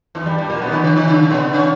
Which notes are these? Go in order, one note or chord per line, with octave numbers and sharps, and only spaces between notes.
E2 E3
G2 G3
G2 G3
A#2 A#3
B2 B3
C#4
D#3 D#4
B3
C#3 C#4
D#3 D#4
C#3 C#4
B2 B3
C#3 C#4